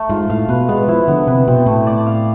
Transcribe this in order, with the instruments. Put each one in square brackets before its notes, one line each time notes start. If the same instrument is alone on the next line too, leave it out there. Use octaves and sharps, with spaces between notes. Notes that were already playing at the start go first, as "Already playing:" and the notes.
Already playing: [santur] A3
[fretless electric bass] G#2 [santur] F4
[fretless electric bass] A2 [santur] F5
[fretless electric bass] B2 [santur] B4
[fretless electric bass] G#3 [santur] B3
[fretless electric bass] F3 [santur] E4
[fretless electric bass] D3 [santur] B3
[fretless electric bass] C3 [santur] B4
[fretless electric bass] B2 [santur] C4
[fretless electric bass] A2 [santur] A3
[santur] D5
F5